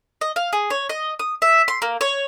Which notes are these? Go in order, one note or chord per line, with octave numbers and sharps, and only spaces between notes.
D#5
F5
G#4
C#5
D#5
D#6
E5
C6
A#3
C#5